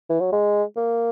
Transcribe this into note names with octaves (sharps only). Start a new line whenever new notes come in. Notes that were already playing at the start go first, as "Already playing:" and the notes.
E3
F#3
G#3
A#3